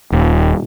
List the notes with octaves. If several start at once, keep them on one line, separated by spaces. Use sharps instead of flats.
D#1